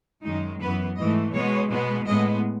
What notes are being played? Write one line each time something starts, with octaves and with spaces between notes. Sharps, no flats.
F#2 D#3 G#3 D#4
F#2 E3 B3 B4
G#2 E3 A3 D#5
B2 G#3 B3 C#5
B2 G#3 B3
A2 G#3 B3 D#5